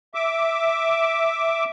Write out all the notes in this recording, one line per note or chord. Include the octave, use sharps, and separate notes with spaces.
E5 D6